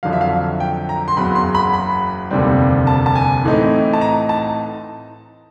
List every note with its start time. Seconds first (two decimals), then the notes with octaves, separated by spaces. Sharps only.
0.03 F2 D3 F#3 F5
0.13 E5
0.21 F5
0.60 G5
0.89 A#5
1.08 C6
1.17 F#1 E2 C#3 F#3 B5
1.35 C6
1.55 B5
1.73 B5
2.31 F1 D#2 D3 G3 C4
2.87 A5
3.06 A5
3.15 G#5
3.44 A2 E3 A3 C4 D#4
3.93 A5
4.01 A#5
4.29 A5